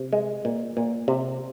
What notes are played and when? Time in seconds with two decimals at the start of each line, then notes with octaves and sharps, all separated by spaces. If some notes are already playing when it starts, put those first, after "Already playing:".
Already playing: C3
0.13 G#3
0.45 A#2
0.77 A#2
1.08 C3